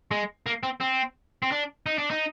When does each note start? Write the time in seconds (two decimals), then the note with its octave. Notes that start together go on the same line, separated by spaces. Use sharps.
0.11 G#3
0.46 A#3
0.63 C4
0.81 C4
1.43 C4
1.52 D4
1.86 D#4
1.98 D4
2.10 D#4